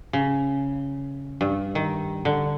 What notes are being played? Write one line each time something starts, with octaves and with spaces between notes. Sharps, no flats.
C#3
G2
D#3
D3